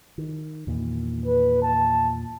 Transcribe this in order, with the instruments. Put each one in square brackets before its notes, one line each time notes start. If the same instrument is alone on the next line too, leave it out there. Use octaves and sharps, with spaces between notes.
[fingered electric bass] D#3
E2 A#2 D#3
[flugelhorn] B4
A5